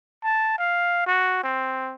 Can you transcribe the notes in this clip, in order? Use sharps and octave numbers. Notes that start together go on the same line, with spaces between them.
A5
F5
F#4
C4